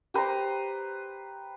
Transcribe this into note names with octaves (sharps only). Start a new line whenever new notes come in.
G4 B4 C5 A#5